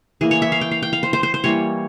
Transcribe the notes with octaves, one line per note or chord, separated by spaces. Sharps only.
E3 A#3 G#4
C#5
E5
F5
G5
F5
G5
F5
C5
C5
C5
C5
E3 G3 A#3 C#5